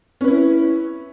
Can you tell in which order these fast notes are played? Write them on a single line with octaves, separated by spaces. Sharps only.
C#4 B4 E4